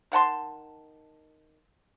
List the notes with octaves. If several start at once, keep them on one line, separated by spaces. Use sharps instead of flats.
D#3 F#5 A5 C6